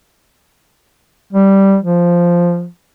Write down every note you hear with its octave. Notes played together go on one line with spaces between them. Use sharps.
G3
F3